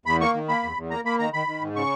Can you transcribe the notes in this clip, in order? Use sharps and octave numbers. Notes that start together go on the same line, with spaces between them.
E2 B5
A#3 C#6
D#3
A#3 B5
E2
E2
A#3 A#5
A#3 B5
D#3 A#5
D#3 B5
D#3
G#2
C#3 C#6